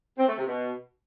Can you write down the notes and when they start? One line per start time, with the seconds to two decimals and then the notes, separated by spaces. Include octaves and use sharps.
0.18 C4
0.28 A3
0.38 C3
0.48 B2